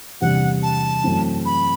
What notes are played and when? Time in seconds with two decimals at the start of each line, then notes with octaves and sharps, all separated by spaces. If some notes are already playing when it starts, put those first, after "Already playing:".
0.20 E2 C3 G3 D4 F#5
0.63 A5
1.04 F#2 E3 A3 C4
1.45 B5